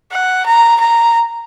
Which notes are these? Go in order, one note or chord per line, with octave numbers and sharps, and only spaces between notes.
F#5
A#5
A#5